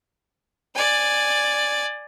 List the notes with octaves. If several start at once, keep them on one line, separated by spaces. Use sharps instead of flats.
D5 G#5